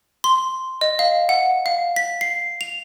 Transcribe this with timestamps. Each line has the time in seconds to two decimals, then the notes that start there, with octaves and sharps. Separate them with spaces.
0.24 C6
0.81 D#5
0.99 F5
1.29 F#5
1.66 F5
1.96 B6
2.21 C7
2.61 F7